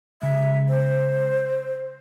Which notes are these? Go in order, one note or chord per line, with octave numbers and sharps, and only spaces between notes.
C#3 G#3 E5
C5